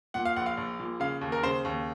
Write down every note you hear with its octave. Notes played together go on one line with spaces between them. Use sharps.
A#2 F#5
F5
A#1 F#5
F5
A#1
A#2
C#3 F5
D#2
A#4
C#3 C5
D#2